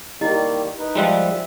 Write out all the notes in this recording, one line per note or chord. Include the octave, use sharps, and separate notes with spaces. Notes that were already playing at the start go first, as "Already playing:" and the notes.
D#3 G3 A#3 E4 G4 D#5
D#4 B4
F3 G3 G#3 F4 C5 E5